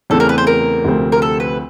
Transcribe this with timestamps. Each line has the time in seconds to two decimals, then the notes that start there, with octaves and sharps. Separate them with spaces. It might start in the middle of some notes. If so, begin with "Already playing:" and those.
0.10 E2 C#3 E3 A3 C4 A4
0.20 A#4
0.29 B4
0.38 C5
0.47 A#4
0.85 D2 C3 F3 A3 C4
1.12 A#4
1.22 A4
1.40 B4